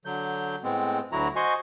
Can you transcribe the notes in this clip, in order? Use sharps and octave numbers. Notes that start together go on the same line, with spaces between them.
D3 F#3 G6
A2 G#3 B3 C4
D2 D3 F#3 E4 F#4 A#5
F#4 C5 D#5 G#5 C6 C#6